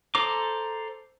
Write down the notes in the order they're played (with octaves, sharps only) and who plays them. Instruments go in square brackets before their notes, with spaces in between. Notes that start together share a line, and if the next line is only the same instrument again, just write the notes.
[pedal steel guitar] A4 C5 A#5 D6